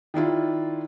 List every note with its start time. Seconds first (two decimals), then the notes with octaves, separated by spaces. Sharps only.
0.14 D#3 D4 E4 F4